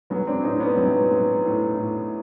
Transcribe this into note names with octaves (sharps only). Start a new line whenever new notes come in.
F#3 B3 C#4
C4 D4
A2 C#4 D#4
B3 C#4
F#3 C4
F#3
A2
A2